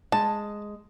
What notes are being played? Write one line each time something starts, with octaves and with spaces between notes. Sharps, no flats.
G#3 A5